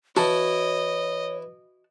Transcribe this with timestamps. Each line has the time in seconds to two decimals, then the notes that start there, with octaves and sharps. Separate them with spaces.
0.17 E3 E4 F#4 C#5 D#5 A5